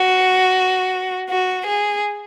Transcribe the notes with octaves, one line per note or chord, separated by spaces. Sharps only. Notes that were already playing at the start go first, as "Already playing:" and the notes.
Already playing: F#4
F#4
G#4